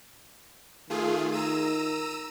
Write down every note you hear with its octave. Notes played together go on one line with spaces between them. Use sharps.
D#3 A3 F4 G#4
A#5 E6 D#7